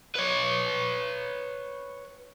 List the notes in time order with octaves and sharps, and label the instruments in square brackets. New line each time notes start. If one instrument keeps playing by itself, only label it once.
[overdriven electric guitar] B4 C#5